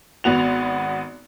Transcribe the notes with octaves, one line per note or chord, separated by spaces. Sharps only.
G#1 B3 F#4 F7